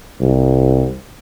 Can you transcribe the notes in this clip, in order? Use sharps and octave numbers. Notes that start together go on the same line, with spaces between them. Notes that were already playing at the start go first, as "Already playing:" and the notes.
C2